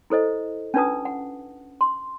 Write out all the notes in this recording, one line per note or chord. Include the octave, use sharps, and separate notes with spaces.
E4 A4 C5 D#5
C#4 D4 F4 B4 A5 D#6
F#5
C6